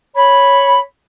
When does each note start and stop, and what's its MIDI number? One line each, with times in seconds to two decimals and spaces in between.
0.16 0.80 73
0.16 0.80 83